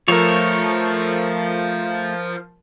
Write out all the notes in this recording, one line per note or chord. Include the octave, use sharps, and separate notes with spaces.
F3 A3 F4 A4 A#4 C5 C#5